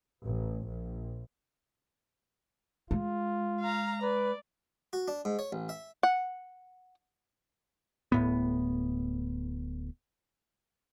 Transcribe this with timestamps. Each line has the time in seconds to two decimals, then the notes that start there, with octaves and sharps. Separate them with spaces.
0.24 A1
0.67 A#1
2.91 G#3 F4
3.60 F5 A#5
4.02 B4 D5
4.93 F#4
5.08 D4
5.25 G#2
5.39 C#5
5.52 A1
5.69 E5
6.03 F#5
8.12 D1 A2 B3